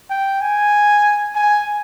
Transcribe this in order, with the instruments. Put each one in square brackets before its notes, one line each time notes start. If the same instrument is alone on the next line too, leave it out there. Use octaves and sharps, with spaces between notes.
[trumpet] G5
G#5
G#5